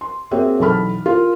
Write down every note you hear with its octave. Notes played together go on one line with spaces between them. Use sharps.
C6
A#3 C4 F#4 G#4 C#5 E5
B1 E3 A4 A5 B5 F6
F4 A#4